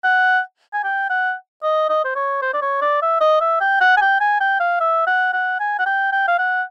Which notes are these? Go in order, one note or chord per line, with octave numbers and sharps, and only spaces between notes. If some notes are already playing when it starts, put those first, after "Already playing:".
F#5
G#5
G5
F#5
D#5
D#5
C5
C#5
C5
D5
C#5
D5
E5
D#5
E5
G5
F#5
G#5
G5
G#5
G5
F5
E5
F#5
F#5
G#5
F#5
G5
G5
F5
F#5